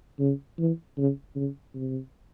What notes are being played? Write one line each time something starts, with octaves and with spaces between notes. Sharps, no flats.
C#3
E3
C#3
C#3
C3